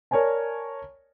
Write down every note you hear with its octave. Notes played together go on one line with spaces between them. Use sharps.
A#4 C#5 D5 G#5 A5